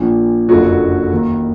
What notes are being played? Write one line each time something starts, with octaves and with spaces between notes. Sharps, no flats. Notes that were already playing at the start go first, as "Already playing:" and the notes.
Already playing: A#1 A#2 F3
F#1 F2 D3 F3 F#3 F#4
D#2 D#3